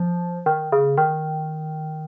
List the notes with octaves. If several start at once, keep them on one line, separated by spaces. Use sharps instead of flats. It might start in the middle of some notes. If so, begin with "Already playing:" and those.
Already playing: F3
D#3
C#3
D#3